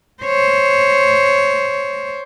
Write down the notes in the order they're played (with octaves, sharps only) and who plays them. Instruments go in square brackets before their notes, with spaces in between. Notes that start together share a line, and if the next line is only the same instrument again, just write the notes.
[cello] C5 C#5